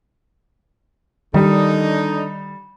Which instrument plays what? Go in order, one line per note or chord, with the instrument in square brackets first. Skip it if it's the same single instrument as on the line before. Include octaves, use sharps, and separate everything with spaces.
[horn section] D3 D4 D#4 [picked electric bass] D#3 [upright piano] G3